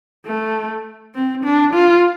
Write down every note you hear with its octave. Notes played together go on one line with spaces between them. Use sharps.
A3
C4
D4
F4